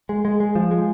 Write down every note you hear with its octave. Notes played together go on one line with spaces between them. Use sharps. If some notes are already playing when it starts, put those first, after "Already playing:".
G#3
G#3
G#3
F3
G#3